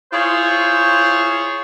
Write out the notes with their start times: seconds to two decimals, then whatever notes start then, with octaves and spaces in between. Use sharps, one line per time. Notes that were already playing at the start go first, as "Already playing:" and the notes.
0.13 E4 F4 G#4 C5 C#5